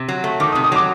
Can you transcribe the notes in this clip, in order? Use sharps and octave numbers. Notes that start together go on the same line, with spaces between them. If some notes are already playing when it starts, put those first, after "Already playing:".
Already playing: C3
F#3
A3
D#3 D6
D#6
C3
D#6
F#3 D6